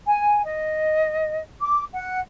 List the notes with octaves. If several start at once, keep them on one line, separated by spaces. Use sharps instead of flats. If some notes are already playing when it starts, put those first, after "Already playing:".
G#5
D#5
D6
F#5